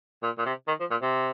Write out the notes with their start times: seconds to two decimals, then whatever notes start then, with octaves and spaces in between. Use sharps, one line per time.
0.23 A#2
0.38 A#2
0.46 C3
0.68 D#3
0.80 F3
0.91 A#2
1.02 C3